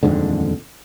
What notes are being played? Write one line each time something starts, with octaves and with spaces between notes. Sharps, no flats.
D#1 F2 G#2 D3